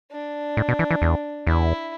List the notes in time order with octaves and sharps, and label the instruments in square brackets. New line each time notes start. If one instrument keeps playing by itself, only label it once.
[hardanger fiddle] D4
[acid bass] A2
B2
E3
E3
E2
[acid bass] E2 [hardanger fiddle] E4